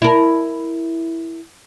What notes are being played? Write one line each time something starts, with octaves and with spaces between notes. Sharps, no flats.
E4 A#4